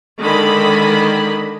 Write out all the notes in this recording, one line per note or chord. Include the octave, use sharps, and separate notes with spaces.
D3 D#3 G#3 D#5 B5